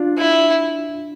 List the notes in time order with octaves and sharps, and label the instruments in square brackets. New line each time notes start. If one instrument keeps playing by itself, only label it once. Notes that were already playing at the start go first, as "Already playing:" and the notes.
Already playing: [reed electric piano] D4 F4
[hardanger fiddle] E4